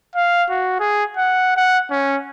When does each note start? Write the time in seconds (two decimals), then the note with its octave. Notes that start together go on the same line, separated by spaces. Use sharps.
0.16 F5
0.50 F#4
0.80 G#4
1.17 F#5
1.57 F#5
1.91 C#4